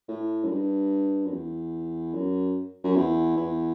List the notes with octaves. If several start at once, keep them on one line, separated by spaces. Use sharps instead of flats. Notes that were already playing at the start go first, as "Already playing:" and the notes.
A2
F#2
G2
F#2
E2
F#2
F#2
E2
E2